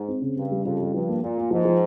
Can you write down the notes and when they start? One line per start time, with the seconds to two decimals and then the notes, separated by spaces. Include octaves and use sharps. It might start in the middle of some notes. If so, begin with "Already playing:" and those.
Already playing: G#2
0.08 C4
0.22 C#3
0.37 G2 C#3
0.51 G3
0.65 F2 C#3
0.80 G3
0.94 G2 F3
1.09 A#3
1.22 A#2 A#3
1.38 A#3
1.51 G#2 F3
1.65 F3